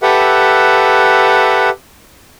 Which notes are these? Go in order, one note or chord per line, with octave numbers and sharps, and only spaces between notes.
G4 A4 B4 E5 F#5